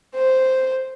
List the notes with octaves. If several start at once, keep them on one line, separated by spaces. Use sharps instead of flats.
C5